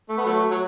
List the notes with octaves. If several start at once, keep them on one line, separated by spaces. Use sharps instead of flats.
A3
B3
F#3 A3
F#3